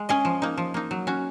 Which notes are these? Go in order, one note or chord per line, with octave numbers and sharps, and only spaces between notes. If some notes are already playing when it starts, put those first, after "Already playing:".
Already playing: G#3
C#4 G#4 D#5
F3
A#3 D#4
F3
A#3 D#4
F#3
C#4 F#4